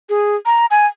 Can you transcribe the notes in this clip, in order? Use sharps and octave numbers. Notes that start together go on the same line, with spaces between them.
G#4
A#5
G#5